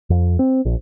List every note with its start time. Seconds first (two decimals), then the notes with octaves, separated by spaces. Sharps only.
0.10 F2
0.39 C4
0.65 A#1